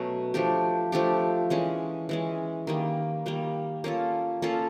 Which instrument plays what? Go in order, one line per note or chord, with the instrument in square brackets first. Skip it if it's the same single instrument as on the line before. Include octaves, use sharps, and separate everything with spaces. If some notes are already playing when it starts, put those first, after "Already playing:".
Already playing: [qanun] B2 F#3 A3 C#4
F3 A3 D4 G4
F3 A3 D4 G4
E3 G#3 C#4
E3 G#3 C#4
D#3 G3 A#3
D#3 G3 A#3
A#3 C#4 F4 A4
A#3 C#4 F4 A4